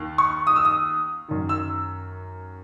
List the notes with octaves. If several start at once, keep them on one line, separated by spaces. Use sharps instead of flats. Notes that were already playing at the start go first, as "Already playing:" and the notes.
Already playing: D#2 D#3
C#6
D#6
E6
D#6
F#2 D#3
E6